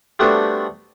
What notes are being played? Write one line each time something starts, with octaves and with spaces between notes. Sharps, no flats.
G3 A3 B3 C4 D4 F#4